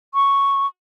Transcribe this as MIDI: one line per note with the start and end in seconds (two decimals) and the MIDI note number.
0.14 0.67 85